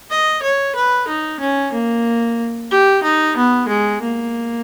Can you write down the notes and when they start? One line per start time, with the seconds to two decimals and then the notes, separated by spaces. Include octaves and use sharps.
0.10 D#5
0.42 C#5
0.75 B4
1.08 D#4
1.39 C#4
1.72 A#3
2.71 G4
3.03 D#4
3.36 B3
3.68 G#3
4.02 A#3